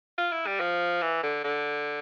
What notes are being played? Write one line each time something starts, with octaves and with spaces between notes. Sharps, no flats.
F4
E4
G3
F3
E3
D3
D3